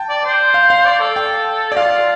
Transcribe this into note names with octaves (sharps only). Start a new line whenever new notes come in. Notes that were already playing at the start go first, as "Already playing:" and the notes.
Already playing: G5 A5
D5
C5
F5
F5
D5
A4
G5
D5
F4 F5